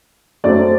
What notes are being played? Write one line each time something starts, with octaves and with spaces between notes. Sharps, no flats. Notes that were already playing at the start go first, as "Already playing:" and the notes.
F#2 F#3 A3 C4 D5